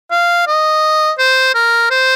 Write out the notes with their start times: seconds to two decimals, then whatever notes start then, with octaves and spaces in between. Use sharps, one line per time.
0.11 F5
0.47 D#5
1.18 C5
1.54 A#4
1.90 C5